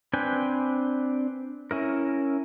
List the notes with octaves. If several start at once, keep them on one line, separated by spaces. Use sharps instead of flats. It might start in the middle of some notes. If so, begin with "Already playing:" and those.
C4 D4 B4 G5 G#5
C#4 E4 A#4